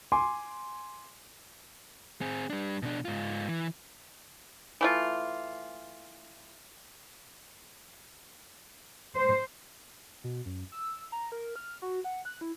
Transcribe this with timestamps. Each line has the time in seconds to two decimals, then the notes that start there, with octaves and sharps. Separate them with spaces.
0.12 G#5 C6 D6
2.21 C4 G#4
2.50 G3 D4
2.82 B2 D4
3.05 G#2 F4
3.49 E3
4.81 E3 A3 F4
9.14 C5
10.24 B2
10.46 F#2
10.72 E6
11.12 A#5
11.32 A#4
11.56 F6
11.82 F#4
12.04 F#5
12.25 F#6
12.41 E4